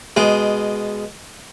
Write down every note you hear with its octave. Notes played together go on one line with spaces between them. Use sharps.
B2 G#3